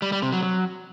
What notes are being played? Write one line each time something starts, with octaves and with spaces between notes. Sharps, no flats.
G3
G3
C3
F#3
F#3